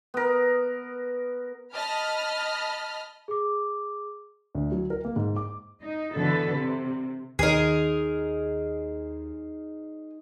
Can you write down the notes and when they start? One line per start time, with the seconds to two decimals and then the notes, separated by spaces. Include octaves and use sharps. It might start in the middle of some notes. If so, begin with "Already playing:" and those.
0.14 B3 A#4
1.73 D#5 A5 B5 F6
3.28 G#4 D6
4.55 D2
4.72 F#3
4.90 A#4
5.05 A#3
5.16 G#2
5.36 D6
5.82 D#4
6.14 B2 D3 E3 A4 B4
6.56 C3
7.39 D#2 D#4 G#4 A#4 C5